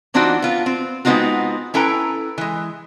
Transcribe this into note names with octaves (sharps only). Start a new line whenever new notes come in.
E3 C4 D4 D#4 F4 F#4
B3 F4
C4
G#3 B3 C4 D#4 F4 F#4
C#4 E4 A4 B4 G5 A#5
E3 G#3